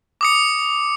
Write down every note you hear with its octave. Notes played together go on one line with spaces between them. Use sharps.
D6 D#6 C#7